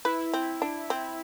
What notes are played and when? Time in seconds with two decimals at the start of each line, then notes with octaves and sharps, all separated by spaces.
0.05 E4 B4
0.34 C4
0.62 D4
0.90 C4